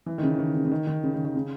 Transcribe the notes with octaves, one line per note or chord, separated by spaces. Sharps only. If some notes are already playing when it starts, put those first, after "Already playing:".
E3
D#3
C#3
D#3
C#3
C#3
D#3
D#3
C#3
D#3
D#3
C#3